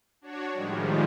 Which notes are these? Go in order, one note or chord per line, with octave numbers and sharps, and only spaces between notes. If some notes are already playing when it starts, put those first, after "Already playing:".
D4 F#4 C#5
A2 D#3 F3 G3 G#3